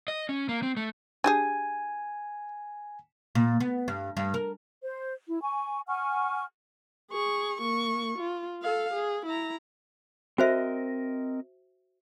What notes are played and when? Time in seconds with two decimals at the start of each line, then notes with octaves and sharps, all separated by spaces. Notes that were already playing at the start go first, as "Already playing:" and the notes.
0.08 D#5
0.29 C#4
0.49 A#3
0.63 C4
0.77 A3
1.24 D4 G4 G#4 G#5
3.35 A#2
3.60 B3
3.88 G2
4.17 G2
4.34 A#4
4.84 C5
5.27 E4
5.42 G#5 C#6
5.87 F#5 G#5 C#6 F6
7.11 G#4 C#6
7.61 A#3 C#6
8.18 F4
8.63 A4 F5
8.94 G#4
9.26 E4 A#5
10.38 C4 F#4 A#4 C5 D#5 E5